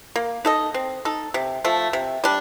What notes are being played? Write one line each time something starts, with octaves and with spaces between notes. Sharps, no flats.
A#3
D#4 A4 D#5
C4
D#4 A4
C3
F3 A3
C3
G3 D4